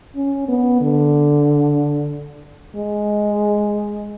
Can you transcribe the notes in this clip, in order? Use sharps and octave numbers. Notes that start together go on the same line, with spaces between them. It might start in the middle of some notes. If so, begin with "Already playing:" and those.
C#4
B3
D3
G#3